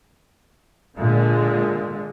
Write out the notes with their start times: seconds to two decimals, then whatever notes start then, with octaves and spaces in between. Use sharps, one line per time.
0.98 A#2 D3 G#3